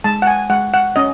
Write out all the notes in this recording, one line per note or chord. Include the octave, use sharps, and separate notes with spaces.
G#3 A5
F#5
G#5
G#3 F#5
F#5
C#4 D#5